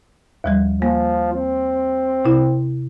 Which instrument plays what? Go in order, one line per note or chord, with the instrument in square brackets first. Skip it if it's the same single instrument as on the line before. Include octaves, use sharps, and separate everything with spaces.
[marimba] D#2 F3 G3
[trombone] F3 [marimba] A#3
[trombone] C4
[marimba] C3 E4